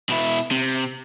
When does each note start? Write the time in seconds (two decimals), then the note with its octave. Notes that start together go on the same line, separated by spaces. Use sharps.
0.10 B2 E4
0.51 C3